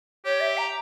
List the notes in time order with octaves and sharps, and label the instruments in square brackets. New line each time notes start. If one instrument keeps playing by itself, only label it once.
[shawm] G4 [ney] C#5
[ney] E5
A#5